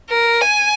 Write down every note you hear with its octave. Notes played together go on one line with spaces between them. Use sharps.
A#4
G#5